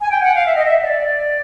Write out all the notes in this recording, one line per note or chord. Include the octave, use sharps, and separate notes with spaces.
G#5
G5
F#5
F5
E5
D#5
E5
D5